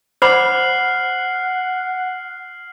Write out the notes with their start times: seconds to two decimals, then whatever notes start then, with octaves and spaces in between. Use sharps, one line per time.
0.22 C5 F#5 B5 D6 F6 C7 F#7